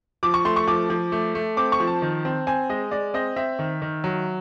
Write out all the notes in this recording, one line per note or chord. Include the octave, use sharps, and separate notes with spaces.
F3 D6
C#6
A3 C6
C#6
F3 D6
F3
A3
A3
C4 D6
C#6
F3
A5
D#3
C4
C4 G#5
G#3 D#5
G#3 D5
C4 D#5
C4 E5
D#3
D#3
F#3